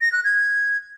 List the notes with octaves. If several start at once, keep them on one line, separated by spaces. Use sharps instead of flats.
A#6
F#6
G#6